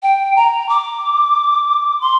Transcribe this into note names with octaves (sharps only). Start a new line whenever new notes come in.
G5
A#5
D6
C6